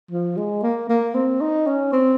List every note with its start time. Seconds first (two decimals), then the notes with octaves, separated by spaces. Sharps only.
0.11 F3
0.37 G#3
0.63 A#3
0.89 A#3
1.14 C4
1.41 D#4
1.67 C#4
1.92 C4